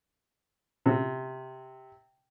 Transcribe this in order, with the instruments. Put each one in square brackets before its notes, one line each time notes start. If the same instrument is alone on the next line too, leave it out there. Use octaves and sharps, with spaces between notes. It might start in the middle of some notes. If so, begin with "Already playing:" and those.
[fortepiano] C3